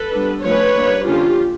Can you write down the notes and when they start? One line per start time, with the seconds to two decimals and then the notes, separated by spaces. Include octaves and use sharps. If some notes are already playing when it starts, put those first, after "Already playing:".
Already playing: A4 B4
0.13 G3 B3 D4
0.43 F3 A3 C#4 B4 C#5
0.75 G3 A#3 D4
1.06 D3 F3 A#3 C#4 F4 G4